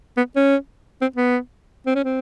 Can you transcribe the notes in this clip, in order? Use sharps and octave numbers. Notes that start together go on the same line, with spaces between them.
B3
C#4
C4
B3
C4
C#4
C4